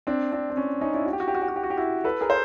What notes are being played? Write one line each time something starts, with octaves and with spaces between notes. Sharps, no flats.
C4 D4
C4 D4
C4
C#4
C#4 D#4
D4 E4
F#4
G4
F#4
G4
F#4
G4
F#4
G4
F#4
G4
E4 F#4
A4 B4
G#4 A#4
C5